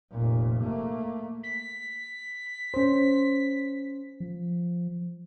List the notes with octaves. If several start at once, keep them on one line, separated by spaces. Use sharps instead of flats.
F1 A#2
A3 A#3
B6
C#4 C5
F3